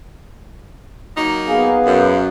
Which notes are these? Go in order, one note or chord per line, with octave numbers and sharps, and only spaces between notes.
F#3 A#3 D#4
B3 G#4 F5
F#2